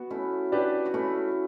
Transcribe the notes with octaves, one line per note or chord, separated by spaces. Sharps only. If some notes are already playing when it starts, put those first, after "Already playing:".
Already playing: B3 F#4
A3 C#4 E4
D4 G4 B4 D5
F#4
A3 C#4 E4